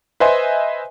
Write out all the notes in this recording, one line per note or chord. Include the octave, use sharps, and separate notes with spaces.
B4 C5 D#5 E5 G#5 C6